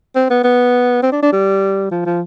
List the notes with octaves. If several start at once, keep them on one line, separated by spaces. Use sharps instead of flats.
C4
B3
B3
C4
D4
D4
G3
F3
F3